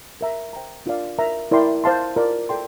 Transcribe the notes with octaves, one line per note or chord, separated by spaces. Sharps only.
A#4 E5 A#5
C5 G5 A#5
D4 F4 A#4 D5 F5
A#4 E5 A#5
E4 A#4 D5 G5 C6
C5 F5 A5 C6
F4 A#4 D5
A4 D5 G5 C6